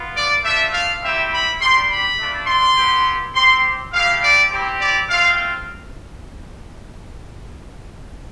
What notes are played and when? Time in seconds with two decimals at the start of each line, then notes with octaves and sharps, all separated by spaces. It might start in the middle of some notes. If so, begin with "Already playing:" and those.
Already playing: B3 F4
0.15 D5
0.44 A3 D4 F4 E5
0.72 F5
1.03 G3 C4 E4 G4 E5
1.31 B5
1.60 G3 D4 G4 C6
1.89 B5
2.19 A3 D4 F4
2.47 C6
2.76 B3 E4 G4
3.34 C4 G4 C6
3.93 A3 E4 G4 F5
4.22 D5
4.50 C4 E4 G4
4.80 D5
5.09 A3 C4 F4 F5